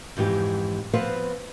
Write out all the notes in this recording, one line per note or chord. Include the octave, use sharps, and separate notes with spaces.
F2 G#2 E3 G4
F3 B3 C4 B4 C5 F5